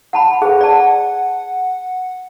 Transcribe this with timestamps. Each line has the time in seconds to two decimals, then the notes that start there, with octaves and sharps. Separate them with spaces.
0.13 F#5 A5 B5
0.42 G#4 B4 F#5
0.61 D5 A5